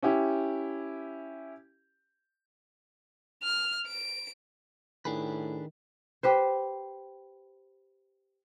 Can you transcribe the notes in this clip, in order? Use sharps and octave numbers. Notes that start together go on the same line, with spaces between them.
C#4 E4 G4
F6
D7
A2 D#3 D4 G#4 B4
G4 B4 C5